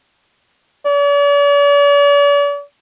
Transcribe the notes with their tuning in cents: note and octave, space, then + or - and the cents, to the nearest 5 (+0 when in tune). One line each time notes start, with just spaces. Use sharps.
D5 -45